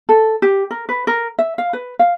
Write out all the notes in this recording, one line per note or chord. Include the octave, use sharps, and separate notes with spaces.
A4
G4
A#4
B4
A#4
E5
F5
B4
F5